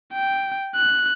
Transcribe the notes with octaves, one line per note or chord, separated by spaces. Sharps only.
G5
F#6